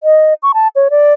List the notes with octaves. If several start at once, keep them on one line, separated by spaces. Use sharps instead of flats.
D#5
C#6
A5
C#5
D5